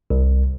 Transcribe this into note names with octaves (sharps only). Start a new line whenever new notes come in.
C2